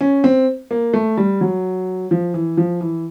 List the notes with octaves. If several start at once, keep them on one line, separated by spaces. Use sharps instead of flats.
C#4
C4
A#3
A3
G3
F#3
F3
E3
F3
E3